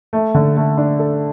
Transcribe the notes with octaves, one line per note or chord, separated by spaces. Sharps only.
A3
D3
A3
D4
A4